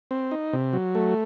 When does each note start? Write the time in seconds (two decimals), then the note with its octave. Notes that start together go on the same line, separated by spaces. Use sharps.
0.11 C4
0.31 D#4
0.53 C3
0.73 F#3
0.95 A3